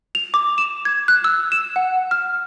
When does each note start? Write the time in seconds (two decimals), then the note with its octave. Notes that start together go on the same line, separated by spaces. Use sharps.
0.15 F7
0.34 D6
0.58 E7
0.85 G#6
1.08 F#6
1.24 E6
1.52 E7
1.76 F#5
2.11 F6